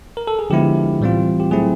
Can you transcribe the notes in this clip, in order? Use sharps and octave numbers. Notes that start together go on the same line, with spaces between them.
A#4
A4
G#4
D3 F3 G#3 B3 E4 G4
A2 E3 G3 C4 F4
G4
F#3 A3 C4 E4 G#4